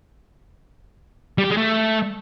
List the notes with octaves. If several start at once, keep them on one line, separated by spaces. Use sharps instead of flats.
G3
G4
G#3
A3